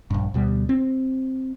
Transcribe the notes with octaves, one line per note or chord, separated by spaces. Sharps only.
A#1 G2
D2 B2 G3
C4